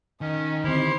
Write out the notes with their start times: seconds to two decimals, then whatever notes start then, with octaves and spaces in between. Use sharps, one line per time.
0.21 D#3 C#4 D#5
0.64 D3 C4 E4 G4 C5 C6